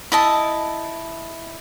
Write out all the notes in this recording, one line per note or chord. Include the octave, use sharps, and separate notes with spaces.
E4 D#5 A5